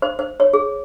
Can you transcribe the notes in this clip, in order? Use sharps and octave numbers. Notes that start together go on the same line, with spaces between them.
C5
C5
C#5
G#4